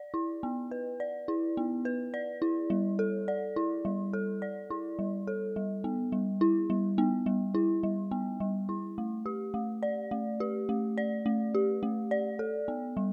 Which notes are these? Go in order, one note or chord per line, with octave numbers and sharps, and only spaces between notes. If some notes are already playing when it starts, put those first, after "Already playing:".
Already playing: D5
E4
B3
B4
D5
E4
B3
B4
D5
E4
G3
A4
D5
E4
G3
A4
D5
E4
G3
A4
G3
B3
G3
E4
G3
B3
G3
E4
G3
B3
G3
E4
A3
G4
A3
D5
A3
G4
A3
D5
A3
G4
A3
D5
A4
B3
G3